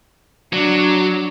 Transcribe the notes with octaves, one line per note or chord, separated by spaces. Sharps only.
F#3 D4